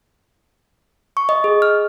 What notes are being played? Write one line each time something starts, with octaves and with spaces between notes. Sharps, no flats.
C#6
D#5
G#4
F6